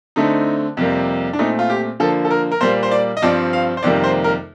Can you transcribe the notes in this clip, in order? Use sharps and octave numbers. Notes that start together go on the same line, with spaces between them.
D3 A3 C4 D#4
F2 C3 G3 A#3
D4
A#2 A3 C4 D#4
F4
G4
D3 F3 A#3 A4
A4
A#4
A#4
A#2 G3 A#3 C5
C5
D5
D#5
G2 F3 C4 D5
F5
C5
F2 C3 D#3 G3 A#3 D5
C5
A#4